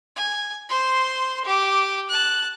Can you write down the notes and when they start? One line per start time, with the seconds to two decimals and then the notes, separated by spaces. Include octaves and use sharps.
0.16 G#5
0.69 C5 C6
1.45 G4 D6
2.09 A5 F#6